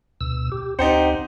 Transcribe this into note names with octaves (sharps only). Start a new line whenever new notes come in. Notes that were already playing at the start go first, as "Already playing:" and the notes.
D2 B2 E6
G4
D2 C4 D#4 G4 C5 F#5